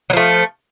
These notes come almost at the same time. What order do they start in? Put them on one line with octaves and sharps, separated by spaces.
F#3 F3 A3